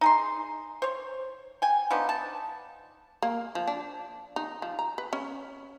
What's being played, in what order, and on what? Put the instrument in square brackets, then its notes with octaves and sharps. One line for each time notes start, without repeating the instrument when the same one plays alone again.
[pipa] D#4 G#4 C6
C5 C#5
G5 G#5
F3 B3 D4 D#4
A5
[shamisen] A#3
F3
D4
D#4
F3
A#5
B4
C#4